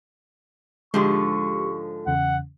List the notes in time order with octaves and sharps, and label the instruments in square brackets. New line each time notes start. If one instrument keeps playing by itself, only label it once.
[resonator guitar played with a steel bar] G#2 D3 F3 [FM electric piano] G#3 G4 [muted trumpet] C#6
[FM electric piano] E2 C#3 [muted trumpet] F#5